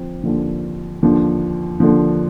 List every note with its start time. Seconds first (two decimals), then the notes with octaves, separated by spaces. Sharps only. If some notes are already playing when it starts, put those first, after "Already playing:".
Already playing: D3 F3 C4
0.24 D#2 D3 F3
1.03 D#2 D3 F3 D4
1.80 D#2 D3 F3